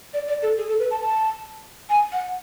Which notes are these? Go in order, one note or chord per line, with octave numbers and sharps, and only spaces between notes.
D5
D5
A4
G#4
A4
B4
A5
A5
G#5
F#5